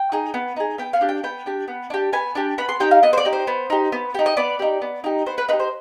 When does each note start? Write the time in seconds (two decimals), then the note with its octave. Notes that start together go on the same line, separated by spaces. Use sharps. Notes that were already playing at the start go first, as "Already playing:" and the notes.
Already playing: G5
0.12 D#4 G#4
0.34 B3
0.56 D#4 G#4
0.78 B3 G5
0.93 F5
1.01 D4 G4
1.09 G5
1.23 B3 G5
1.46 D4 G4
1.68 B3
1.90 D4 G4
2.13 B3 G#5
2.35 D4 G4
2.58 B3 B5
2.69 C6
2.80 D#4 G4 G5
2.91 F5
3.03 B3 D#5
3.13 C5
3.18 D5
3.25 D#4 G4
3.33 C5
3.47 B3
3.70 D#4 G4
3.92 B3
4.14 D#4 G4
4.26 D#5
4.37 B3 D5
4.59 D#4 G4
4.82 B3
5.04 D#4 G4
5.26 B3 C5
5.38 B4
5.48 D#4 B4
5.53 G4
5.60 C5